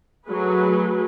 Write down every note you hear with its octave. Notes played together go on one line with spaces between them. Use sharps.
F#3 A3 G#4 B4